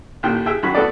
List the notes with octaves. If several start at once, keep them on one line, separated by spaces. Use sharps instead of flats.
A1 A#2 D#3 G5
G4 G#4 E5 G5
F#2 D#3 F#4 B5
A3 B3 F#4 A4 D5